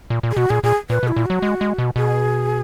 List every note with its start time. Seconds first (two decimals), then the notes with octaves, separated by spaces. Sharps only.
0.10 A#2
0.23 A#2
0.31 G#4
0.37 B2 F#4
0.50 A#2 G#4
0.64 A#2 G#4
0.90 A#2 B4
1.03 B2
1.08 E4
1.16 A#2
1.26 F#3 F#4
1.42 G#3
1.61 G#3
1.78 B2
1.96 B2 G#4